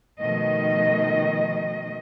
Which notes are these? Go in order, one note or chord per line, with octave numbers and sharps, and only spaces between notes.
B2 D#3 F3 A3 D#5